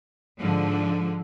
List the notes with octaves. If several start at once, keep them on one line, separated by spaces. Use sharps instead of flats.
G#2 D3 F3